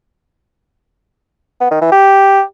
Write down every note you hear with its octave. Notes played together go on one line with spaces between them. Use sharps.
B3
D#3
E3
G4